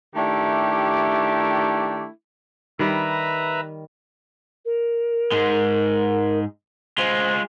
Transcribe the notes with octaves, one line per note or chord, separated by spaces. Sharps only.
D#3 A3 D4 E4 G4
D#3 G3 B4 E5 A#5
A#4
G#2 G#3
G#3 F4 C5